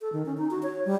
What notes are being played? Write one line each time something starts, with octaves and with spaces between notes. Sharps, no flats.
A4
D#3
C#4
D#4
F#4
C#5
G3